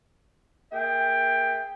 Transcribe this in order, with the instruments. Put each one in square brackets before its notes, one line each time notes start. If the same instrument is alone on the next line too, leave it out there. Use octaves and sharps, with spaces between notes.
[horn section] A#3 G#4 E5 G5